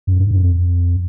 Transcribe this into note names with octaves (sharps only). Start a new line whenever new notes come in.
F#2
G2
F#2
F2